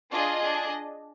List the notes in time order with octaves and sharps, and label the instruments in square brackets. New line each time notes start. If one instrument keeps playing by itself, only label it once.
[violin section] D4 F4 G#4 D#5
D4 G#4